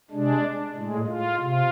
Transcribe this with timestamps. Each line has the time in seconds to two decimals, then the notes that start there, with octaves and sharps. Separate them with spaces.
0.11 C3 G#3 D4
0.74 A2 G#3
1.07 F4
1.39 C3 F4